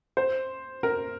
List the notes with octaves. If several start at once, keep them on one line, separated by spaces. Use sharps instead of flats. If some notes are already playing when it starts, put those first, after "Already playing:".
C5
A#4